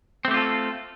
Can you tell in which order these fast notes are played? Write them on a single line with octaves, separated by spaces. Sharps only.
C4 A3 G4 F4 A4